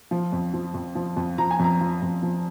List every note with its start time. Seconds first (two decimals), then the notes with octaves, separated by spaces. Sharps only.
0.11 F3
0.32 F2
0.54 F3
0.74 F2
0.95 F3
1.16 F2
1.38 F3 A#5
1.51 G#5
1.59 F2 A#5
1.81 F3
2.02 F2
2.23 F3